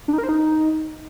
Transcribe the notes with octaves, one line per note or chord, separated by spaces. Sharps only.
D4
D#4
A#4
C5
D#4